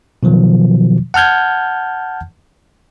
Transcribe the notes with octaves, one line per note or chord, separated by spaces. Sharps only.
B2 D#3 F3 F#3
F#5 A5 F6 G6 G#6